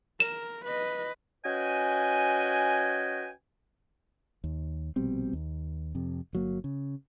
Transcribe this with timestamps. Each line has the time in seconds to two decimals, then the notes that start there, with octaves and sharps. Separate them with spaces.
0.20 A#4 E7
0.65 B4 D#5
1.45 C#4 F#4 B4 D#5 G5 G#5
4.44 D#2
4.96 A#1 B2 G3 C4
5.33 D#2
5.95 F2 C3
6.33 G1 F#3 A#3
6.64 C#3